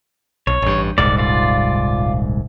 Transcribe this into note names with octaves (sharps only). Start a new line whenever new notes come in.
B1 C#5
A1 G2
D#1 C2 G#2 D5
F4 D5